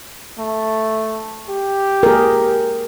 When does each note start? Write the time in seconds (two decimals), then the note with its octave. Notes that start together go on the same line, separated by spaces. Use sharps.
0.38 A3
1.49 G4
2.03 G#4 A#4